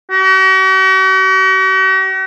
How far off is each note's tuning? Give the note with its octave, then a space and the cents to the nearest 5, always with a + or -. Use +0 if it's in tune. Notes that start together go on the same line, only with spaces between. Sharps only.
F#4 +45